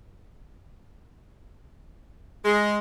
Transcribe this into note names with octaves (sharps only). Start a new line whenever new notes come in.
G#3